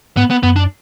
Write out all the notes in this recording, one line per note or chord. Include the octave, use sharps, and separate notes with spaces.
G#2 B3
B3
F#2 B3
D4